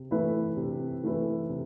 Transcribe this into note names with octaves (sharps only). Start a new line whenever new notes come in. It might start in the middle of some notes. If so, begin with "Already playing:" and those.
Already playing: C3
E3 A3 E4 B4
C3
E3 A3 E4 B4
C3